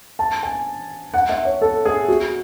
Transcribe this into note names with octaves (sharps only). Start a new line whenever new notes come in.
A5
G#5
F#5
E5
C#5
A4
G#4
F#4